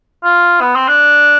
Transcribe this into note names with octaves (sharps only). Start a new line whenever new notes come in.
F4
B3
C4
D4